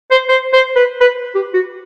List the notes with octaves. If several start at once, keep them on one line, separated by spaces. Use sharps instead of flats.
C5
C5
C5
B4
B4
G4
F#4